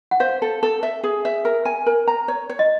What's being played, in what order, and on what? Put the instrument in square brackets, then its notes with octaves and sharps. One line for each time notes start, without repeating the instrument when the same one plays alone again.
[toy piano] F#5
[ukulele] C5 [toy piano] F5
[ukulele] A4
A4
E5
G#4
E5
A#4
G#5
A#4
A#5
C#5
C#5
[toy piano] D#5